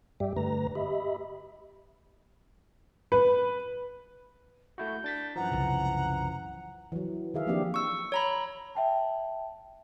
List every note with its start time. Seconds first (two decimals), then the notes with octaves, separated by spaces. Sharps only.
0.20 G2 G3 G4 D5 E5 G5
0.37 G2 D3 A3 B4 A#5 A#6
0.75 G4 D#5 E5 B5
3.12 B4
4.78 A3 E4 F#4 G6
5.04 D4 A6 B6
5.36 F#2 E3 F3 F#5 A#5
5.52 C2 C#3
6.92 E3 F#3
7.34 D#3 G#4 E5 F5
7.47 F3 A#3 C4 D4 G4
7.74 C#6 E6
8.12 C#5 A#5 B5
8.75 E5 G5 A5